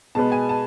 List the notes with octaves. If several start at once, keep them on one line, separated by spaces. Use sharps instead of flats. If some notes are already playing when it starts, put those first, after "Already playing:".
B2 G#3 B3 A5
G#5
A5